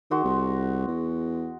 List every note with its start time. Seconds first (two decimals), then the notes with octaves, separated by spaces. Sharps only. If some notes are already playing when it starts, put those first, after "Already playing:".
0.11 D#3 G#3 F#4 C6
0.24 C2
0.87 E2